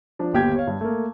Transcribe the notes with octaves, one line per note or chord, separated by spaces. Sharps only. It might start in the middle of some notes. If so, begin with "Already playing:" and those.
F3 D4
G1 D#2 G4 G5 G#6
C#5 F5
G2
A3 A#3